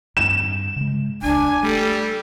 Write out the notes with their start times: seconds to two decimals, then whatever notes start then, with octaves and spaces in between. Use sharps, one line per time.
0.17 G2 E7
0.76 C#3 G#3
1.22 E1 C#2 D4 G#5
1.63 G3 A3 A4